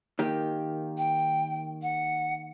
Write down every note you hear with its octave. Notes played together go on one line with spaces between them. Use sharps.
D#3 A#3 G4
G5
F#5